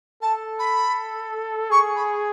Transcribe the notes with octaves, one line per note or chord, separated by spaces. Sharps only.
A4 A5
B5
G#4 C#6
B5